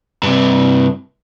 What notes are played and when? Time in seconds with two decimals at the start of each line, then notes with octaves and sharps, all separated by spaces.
0.23 G2 C3